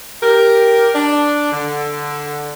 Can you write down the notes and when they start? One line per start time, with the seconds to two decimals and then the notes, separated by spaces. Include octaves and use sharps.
0.22 G4 A#4
0.94 D4
1.52 D3